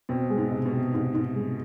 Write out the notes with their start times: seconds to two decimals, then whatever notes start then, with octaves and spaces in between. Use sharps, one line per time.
0.09 B2 C4
0.30 G#3
0.38 G#2
0.52 C3
0.66 B2
0.72 C4
0.94 G#2 C3
1.14 G#2 C3
1.36 G#3